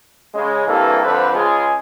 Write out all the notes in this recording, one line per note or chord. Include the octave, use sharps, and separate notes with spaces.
C#3 G#3
C2 G2 E3 A#3 A4
F2 D3 A4 B4 C5
C#2 G#3 F4 G#4